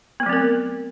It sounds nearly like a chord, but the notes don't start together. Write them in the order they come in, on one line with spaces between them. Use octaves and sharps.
B3 A3 F#3 C4 A#4